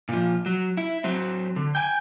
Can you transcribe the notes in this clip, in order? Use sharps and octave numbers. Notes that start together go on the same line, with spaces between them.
A#2 F3
F#3
E4
F#3 C4
D3
G5 G#5